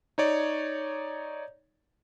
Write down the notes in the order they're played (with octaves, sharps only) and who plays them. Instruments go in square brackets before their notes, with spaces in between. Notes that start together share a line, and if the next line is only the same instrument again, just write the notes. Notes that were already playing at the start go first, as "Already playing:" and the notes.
[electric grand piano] D#4 C#5 D5